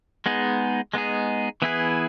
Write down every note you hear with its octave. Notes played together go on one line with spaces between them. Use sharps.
G#3 B3 D#4 G#4
G#3 B3 D#4 G#4
E3 B3 E4 G#4 B4